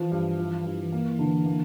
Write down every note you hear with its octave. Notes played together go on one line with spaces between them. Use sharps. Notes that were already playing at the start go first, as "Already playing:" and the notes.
Already playing: E3 F3
G2
E3 F3
G2
A#3
D3
A#3